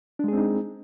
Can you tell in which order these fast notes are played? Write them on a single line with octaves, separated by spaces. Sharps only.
D4 G#3 G#4 C4 D#4